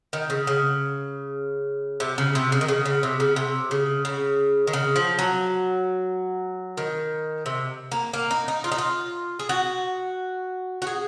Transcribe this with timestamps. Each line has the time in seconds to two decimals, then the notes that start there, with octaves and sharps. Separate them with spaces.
0.13 D#3
0.30 C#3
0.47 C#3
2.00 C3
2.18 C#3
2.35 C3
2.52 C#3
2.61 D#3
2.68 C#3
2.86 C#3
3.03 C3
3.20 C#3
3.36 C3
3.71 C#3
4.05 C#3
4.67 D#3
4.73 C#3
4.96 F3
5.19 F#3
6.77 D#3
7.46 C3
7.92 A#3
8.13 A#3
8.31 D#4
8.48 D#4
8.64 F4
8.72 D#4
8.78 F4
9.39 G#4
9.49 F#4
10.82 F#4
10.87 G#4